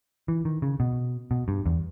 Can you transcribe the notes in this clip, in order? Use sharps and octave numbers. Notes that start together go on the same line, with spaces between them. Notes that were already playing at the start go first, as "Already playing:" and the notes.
E3
D#3
C#3
B2
B2
G2
E2